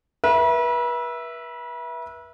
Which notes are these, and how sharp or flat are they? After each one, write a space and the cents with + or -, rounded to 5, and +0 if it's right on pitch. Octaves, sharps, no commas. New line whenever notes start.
B4 -35 E5 +0